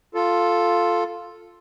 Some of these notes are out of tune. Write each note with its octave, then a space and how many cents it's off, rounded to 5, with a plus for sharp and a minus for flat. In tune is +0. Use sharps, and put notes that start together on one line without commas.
F4 +0 A4 +0